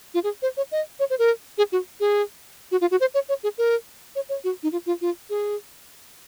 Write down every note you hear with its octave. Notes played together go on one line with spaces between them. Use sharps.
F4
G#4
C5
C#5
D#5
C#5
C5
A#4
G#4
F#4
G#4
F#4
F4
F#4
C5
C#5
C#5
G#4
A#4
C#5
C#5
F#4
D#4
F4
F4
F4
G#4